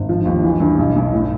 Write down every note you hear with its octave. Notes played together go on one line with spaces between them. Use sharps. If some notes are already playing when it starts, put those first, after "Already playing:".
Already playing: G#1
F3
D#2
E3
G2
B1
B1
A2